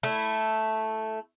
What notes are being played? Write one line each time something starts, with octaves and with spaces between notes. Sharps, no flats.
A3 E4